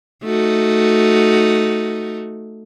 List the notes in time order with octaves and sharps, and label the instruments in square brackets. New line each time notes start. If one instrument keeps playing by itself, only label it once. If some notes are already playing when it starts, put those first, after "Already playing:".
[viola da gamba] A3 D#4 F#4